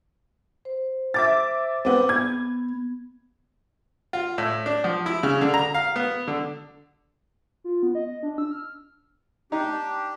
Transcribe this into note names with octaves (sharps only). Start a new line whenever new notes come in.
C5
E5 D6 A6
B3 C4 D6
B3 G#6
F4
A2
D4
F3
E4
C#3
D3
A#5
F5
B3
D3
F4
B3
D#5
D4
E6
F6
D4 D#4 G4